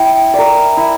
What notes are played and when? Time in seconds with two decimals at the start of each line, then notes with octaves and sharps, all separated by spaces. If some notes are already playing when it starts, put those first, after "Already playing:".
Already playing: E4 G5
0.34 A#4 D5
0.77 E4